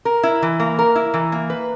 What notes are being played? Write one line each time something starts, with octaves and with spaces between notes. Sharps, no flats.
A#4
E4
E3
A#3
A#4
E4
E3
A#3
B4